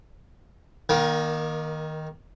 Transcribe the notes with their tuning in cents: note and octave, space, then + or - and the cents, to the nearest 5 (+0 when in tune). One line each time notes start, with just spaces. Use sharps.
D#3 +0 A#3 +30